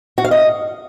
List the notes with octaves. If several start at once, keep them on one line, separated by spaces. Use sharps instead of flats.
F#4
F5
D#5